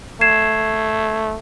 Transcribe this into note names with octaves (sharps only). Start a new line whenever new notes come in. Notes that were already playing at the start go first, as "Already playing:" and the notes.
A3 G#6 C7 E7